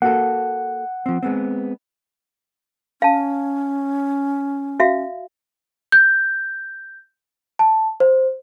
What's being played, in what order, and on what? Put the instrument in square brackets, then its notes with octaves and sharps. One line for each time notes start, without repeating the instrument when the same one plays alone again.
[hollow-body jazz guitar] A#3 F#4 A4 [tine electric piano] F#5
[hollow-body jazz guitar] F3 C4
G#3 B3 C4
[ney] C#4 [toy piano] F5 A5
[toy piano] F#4 E5 F5
[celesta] G6
A5
C5